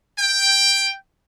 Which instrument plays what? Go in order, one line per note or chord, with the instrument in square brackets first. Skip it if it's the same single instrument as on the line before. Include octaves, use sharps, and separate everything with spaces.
[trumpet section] G5